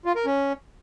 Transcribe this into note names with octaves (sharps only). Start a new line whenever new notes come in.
F4
A#4
C#4